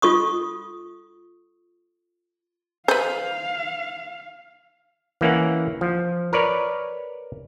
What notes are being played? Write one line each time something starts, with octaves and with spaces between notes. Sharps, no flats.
F4 A4 C#6 D#6
B4 C5 F5
E3 A#3 C#4 F#5
F3
A#4 B4 C#5 D5